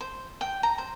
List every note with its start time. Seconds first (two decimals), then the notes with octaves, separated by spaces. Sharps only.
0.01 C5
0.41 G5
0.63 A#5
0.78 C5